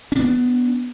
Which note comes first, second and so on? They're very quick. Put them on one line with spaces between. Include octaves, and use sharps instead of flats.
C#4 D4 B3